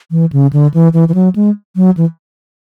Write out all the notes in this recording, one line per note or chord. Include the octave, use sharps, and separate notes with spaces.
E3
C#3
D3
E3
E3
E3
F#3
G#3
F#3
E3